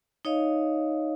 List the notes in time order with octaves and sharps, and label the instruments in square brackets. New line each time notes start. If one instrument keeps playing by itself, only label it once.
[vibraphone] D#4 C#5 D#5 F5